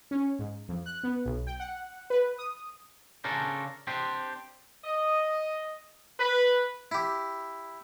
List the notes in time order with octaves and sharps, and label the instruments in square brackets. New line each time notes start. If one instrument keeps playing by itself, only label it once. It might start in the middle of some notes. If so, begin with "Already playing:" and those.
[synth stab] C#4
G#2
F2
F#6
B3
B1
G5
F#5
B4
D#6
[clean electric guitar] C#3 C#4 D4 A4 A#4 C5
C4 D4 G4 C5
[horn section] D#5
B4
[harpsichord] E4 G4